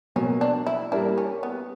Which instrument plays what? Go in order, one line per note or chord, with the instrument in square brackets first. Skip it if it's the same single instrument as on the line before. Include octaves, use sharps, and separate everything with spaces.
[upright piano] B2 F#3 A#3 [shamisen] C#4
[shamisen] D4
E4
[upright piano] G3 A#3 E4 A#4 [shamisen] D4
[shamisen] C#4
B3